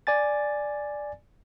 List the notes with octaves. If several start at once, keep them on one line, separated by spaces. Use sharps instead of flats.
D5 G#5 A6